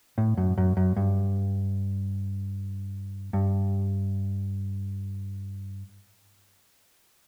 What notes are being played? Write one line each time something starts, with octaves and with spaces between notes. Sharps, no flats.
A2
F#2
F#2
F#2
G2
G2